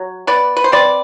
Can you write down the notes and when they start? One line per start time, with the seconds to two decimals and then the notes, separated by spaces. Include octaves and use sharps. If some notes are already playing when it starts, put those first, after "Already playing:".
Already playing: F#3
0.27 B3 B4 D5
0.57 B4
0.64 C5
0.72 C4 B4 D5